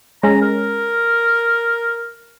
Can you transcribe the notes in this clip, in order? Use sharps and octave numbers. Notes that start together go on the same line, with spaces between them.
G#3 C#4 A#5
A#4